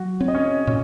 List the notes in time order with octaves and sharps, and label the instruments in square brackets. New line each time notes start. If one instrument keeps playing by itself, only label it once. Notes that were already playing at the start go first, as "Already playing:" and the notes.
Already playing: [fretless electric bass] F#3 [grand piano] F#4
[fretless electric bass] C4 [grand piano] C#5
[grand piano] D#5
C#4 C#5
[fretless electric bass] A#2 [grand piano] C#4 C#5